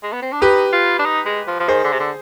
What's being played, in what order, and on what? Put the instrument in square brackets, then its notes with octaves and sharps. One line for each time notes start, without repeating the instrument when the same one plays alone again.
[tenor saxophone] G#3
B3
C4
D4
[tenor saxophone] D#4 [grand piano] G4 B4
[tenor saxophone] F4
D4
D#4
G#3
F3
F3
[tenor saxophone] D#3 [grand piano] G#4 C5
[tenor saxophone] D3
C3
D3